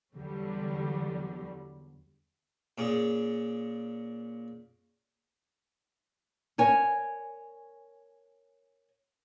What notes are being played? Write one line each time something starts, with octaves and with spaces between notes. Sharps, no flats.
E2 D3 F#3 G3
A#2 C#4 G#4
A#4 C#5 G#5